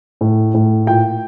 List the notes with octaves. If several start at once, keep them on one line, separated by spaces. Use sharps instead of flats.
A2
A2
A#2 G5